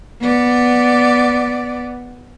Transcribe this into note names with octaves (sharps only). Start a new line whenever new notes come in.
B3 D5